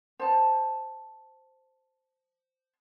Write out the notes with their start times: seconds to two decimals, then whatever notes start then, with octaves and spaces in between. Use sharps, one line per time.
0.20 C5 A5